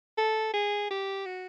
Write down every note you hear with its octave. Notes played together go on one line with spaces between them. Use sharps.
A4
G#4
G4
F#4